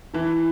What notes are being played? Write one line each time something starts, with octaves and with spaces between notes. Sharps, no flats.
E3 E4